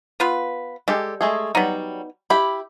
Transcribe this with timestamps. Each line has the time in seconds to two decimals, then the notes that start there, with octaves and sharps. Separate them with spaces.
0.20 B3 F4 B4
0.88 G3 G#3 G4 A4
1.21 G#3 A3 G#4
1.55 F#3 G3 B3 D#4
2.30 E4 G4 B5